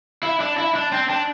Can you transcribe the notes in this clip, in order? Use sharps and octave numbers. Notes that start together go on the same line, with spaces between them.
E4
D4
E4
D4
C4
D4